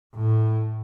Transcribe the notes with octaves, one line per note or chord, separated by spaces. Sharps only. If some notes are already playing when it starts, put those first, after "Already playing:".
A2